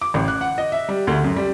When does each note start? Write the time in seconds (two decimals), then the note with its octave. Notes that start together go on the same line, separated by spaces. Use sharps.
0.01 D6
0.14 A1
0.28 F#6
0.41 F#5
0.58 D#5
0.72 E5
0.88 G3
1.07 D2
1.24 F#2
1.36 G3